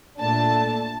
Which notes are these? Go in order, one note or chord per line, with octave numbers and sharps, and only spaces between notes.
A#2 A3 D4 A5